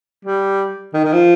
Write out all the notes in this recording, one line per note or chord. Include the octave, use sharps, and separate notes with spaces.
G3
D#3
D#3
F3